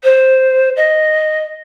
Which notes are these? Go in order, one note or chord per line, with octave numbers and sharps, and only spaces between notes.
C5
D#5